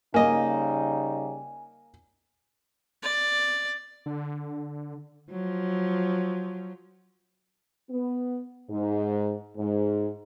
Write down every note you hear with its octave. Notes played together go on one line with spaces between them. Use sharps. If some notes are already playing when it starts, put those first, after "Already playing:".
C#3 G3 A#3 D#4 D#5 G#5
D5
D3
F3 F#3
B3
G#2
G#2